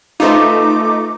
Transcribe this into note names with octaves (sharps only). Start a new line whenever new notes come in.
A3 D#4 F4 B4 C5 D6